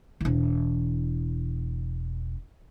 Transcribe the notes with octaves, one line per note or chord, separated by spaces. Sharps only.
E1 E3